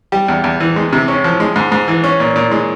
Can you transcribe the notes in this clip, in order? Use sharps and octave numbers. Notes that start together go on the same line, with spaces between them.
G3 G4
E2
E2
E3
G#3
C3
C#4
F3
G#3
G#2
G#2
E3
C#4
A#2
A#2
G#3